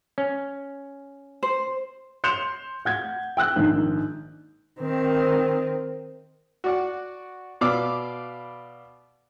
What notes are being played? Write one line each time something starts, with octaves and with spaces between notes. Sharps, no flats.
C#4
C5
C6 G6 C#7 E7 F7
F#5 G6 G#6
G5 E6 F#6 G6
A#1 G#2 D#3
D#3 C4
F#4 D5 F#5
B2 B4 D5 F5 D6 E6